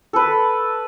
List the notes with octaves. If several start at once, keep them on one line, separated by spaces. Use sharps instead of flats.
A4 B4